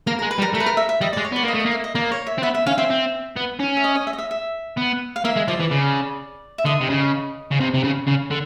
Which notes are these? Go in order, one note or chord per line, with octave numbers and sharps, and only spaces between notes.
A#3 A#4
G#3 A#4
B4
G3
A#4
A3 A#4
B4
A#4
E5
E5
G3 D#5
G#3 D5
C#5
B3 D5
A#3 D#5
A3
D#5
A#3
E5
D#5
A#3 D5
C#5
E5
C4
B3 E5
E5
C#4 F5
C4 E5
C4
B3
C#4
E5
D#5
D#5
E5
D#5
E5
E5
B3
F5
A#3 E5
G#3
F3 D5
E3
C#3
E5
D3 D#5
C3
C#3
C#3
C3
C3
C#3
C#3
D3